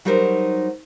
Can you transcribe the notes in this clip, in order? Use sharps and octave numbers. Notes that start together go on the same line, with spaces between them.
F#3 G3 D#4 F#4 A#4 C5